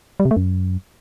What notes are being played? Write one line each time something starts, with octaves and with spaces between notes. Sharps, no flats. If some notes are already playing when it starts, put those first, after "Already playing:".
G3
C3
A3
F#2